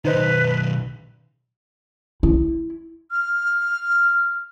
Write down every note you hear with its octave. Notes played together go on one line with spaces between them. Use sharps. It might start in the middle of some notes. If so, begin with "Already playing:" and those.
B1 D#3 D#4 B4 C5 D#5
E4
F6